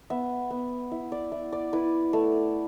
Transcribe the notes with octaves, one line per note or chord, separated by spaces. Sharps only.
B3 E5
B3
E4 E5
D5
E4 E5
D5
E4 B4
A3